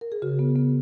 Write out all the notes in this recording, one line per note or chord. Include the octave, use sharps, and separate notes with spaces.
A#4
G#4
C#3 F#4
B3
B3